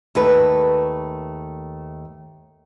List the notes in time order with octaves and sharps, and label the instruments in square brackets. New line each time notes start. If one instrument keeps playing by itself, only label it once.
[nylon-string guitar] D#2 A3 B4